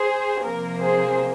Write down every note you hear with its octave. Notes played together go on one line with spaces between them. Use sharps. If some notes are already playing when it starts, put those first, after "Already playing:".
Already playing: G#4 C5
C3 F3 A#3 A#4
G#4 C5